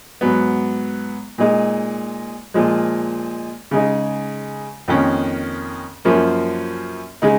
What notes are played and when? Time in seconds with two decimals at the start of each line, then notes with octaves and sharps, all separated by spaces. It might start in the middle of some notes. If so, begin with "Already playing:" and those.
0.21 G#2 F#3 B3
1.38 A#2 G#3 D#4
2.54 A#2 F3 G#3
3.71 C#3 G#3 D#4
4.88 F2 D#3 A#3 C#4
6.05 F#2 F3 A#3 C#4
7.22 C#3 G#3 D#4